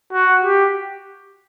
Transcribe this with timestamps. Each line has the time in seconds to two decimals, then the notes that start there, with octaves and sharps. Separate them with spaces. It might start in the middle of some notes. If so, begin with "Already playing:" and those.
0.13 F#4
0.44 G4